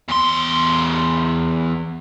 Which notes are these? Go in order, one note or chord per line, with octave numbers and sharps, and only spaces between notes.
E2 C6